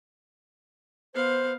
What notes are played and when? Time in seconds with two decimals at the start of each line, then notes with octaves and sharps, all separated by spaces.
1.15 B3 C5 F5